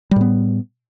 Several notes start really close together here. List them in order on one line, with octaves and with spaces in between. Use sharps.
G3 A2 B3